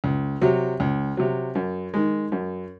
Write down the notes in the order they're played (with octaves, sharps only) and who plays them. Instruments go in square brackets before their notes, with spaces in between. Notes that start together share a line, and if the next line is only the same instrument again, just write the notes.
[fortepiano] C#2
C3 F#3
C#2
C3 F#3
F#2
D#3 G#3
F#2